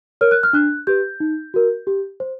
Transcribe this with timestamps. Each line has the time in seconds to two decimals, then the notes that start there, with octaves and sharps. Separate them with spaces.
0.21 A#4 C#5 F6
0.31 F#6
0.43 F6
0.53 D4 F#6
0.87 G4 B4 G6
1.20 D#4
1.54 F#4 A#4
1.87 G4
2.20 C5